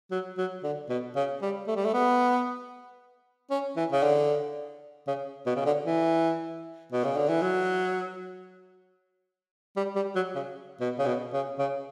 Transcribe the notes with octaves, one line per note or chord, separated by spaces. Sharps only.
F#3
F#3
D3
B2
C#3
G3
A3
G3
A3
B3
C#4
E3
C#3
D3
C#3
B2
C#3
D3
E3
B2
C#3
D3
E3
F#3
G3
G3
F#3
C#3
B2
C#3
B2
C#3
C#3